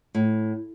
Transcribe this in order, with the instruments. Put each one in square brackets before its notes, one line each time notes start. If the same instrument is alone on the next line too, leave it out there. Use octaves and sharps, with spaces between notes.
[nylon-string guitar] A2